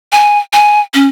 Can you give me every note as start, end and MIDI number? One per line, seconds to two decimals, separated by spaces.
0.12 0.39 80
0.53 0.80 80
0.94 1.06 61